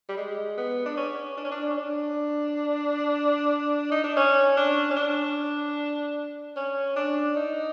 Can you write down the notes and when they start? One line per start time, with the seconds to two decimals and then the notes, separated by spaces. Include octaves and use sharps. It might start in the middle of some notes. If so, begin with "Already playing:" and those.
0.09 G3
0.17 G#3
0.57 B3
0.86 D4
0.97 C#4
1.37 D4
1.44 C#4
1.51 D4
1.70 C#4
1.77 D4
3.91 D#4
4.04 D4
4.17 C#4
4.57 D4
4.91 C#4
4.96 D4
6.56 C#4
6.96 D4
7.36 D#4